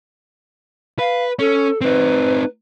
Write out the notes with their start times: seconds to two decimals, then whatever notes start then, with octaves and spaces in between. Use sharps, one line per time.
0.99 B4 F5
1.39 C#4 A4
1.81 C4 D#4 B4